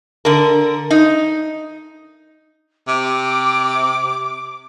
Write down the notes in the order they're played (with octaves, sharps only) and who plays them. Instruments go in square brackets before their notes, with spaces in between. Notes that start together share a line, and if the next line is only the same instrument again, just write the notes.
[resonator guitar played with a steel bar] D3 A#4
D#4
[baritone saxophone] C3 [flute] D6